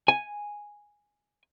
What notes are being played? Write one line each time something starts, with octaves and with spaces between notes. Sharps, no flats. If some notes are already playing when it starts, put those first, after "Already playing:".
G#5